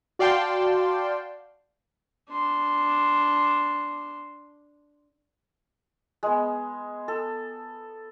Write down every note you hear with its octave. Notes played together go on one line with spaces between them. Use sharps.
F#4 D5 F5 G5 A5 C6
D4 C6
G#3 B3
A4